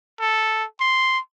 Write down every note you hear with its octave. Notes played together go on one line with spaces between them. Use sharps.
A4
C6